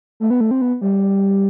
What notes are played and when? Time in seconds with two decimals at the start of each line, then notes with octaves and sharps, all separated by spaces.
0.20 A3
0.30 B3
0.41 A3
0.51 C4
0.62 B3
0.81 G3